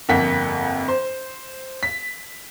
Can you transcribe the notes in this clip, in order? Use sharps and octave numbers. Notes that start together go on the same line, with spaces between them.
G1 F2 A#3 F#5 B6
C5
B6